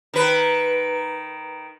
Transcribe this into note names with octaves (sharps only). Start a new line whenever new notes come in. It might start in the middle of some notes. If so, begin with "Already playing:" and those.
D#3 B4